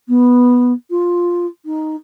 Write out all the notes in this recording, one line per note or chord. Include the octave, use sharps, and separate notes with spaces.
B3
F4
D#4